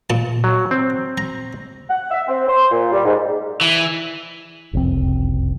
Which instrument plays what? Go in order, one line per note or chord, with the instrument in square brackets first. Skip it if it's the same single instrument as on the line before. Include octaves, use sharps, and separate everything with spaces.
[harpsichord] A#2 A5
[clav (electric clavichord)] F#3
C4
[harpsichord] A#5
[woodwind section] F#5
E5
C4
C5
A#2
G3
G#2
[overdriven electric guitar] E3
[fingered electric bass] F#1 C2 F2 C4